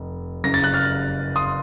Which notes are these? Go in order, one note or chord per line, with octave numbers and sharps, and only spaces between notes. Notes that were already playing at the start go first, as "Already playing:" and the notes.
Already playing: F1
F#1 F#2 C#3 A#6
A6
F#6
F6 A6
C6 D#6